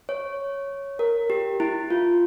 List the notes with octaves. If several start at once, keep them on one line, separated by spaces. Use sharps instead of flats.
C#5
A#4
G4
E4
F4